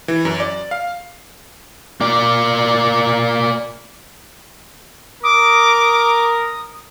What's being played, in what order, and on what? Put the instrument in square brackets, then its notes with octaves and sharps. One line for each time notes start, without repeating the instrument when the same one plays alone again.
[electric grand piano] E3
F#2
D5
F5
[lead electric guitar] A#3 D5
[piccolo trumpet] A#4 [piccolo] D6 [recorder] D#6